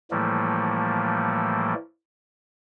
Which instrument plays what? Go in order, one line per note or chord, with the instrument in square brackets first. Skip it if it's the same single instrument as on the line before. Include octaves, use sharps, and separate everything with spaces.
[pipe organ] A2 E3 F3 G3 A3 A#3